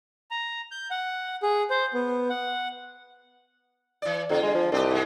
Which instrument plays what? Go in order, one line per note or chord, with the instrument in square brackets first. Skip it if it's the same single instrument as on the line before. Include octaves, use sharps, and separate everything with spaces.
[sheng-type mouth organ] A#5
G6
F#5
G#4
C5
B3
F#5
[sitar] E3 D5
[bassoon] F2 [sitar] D3 F4
[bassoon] G#3
F3
[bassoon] C2 [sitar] D4 G4 D#5
[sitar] G#2 G#3